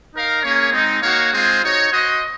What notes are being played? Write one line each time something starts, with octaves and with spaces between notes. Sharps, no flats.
D#4 A#4 F5
A#3 C#4 G#4 C#5
G#3 C4 D#4
A#3 D#4 F#4 C#5 F5
G#3 C4 F4 G#4 C5
D#4 F#4 C#5
F#4 C5 D#5